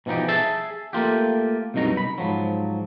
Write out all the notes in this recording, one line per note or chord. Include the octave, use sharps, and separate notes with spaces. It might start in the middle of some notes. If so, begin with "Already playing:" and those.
B2 E3 F3 D#4 G4
G#4 E5 A5
A3 A#3 F4 G4
C2 F#2 B2 D#4 A#5
B5
G#2 F3 F#3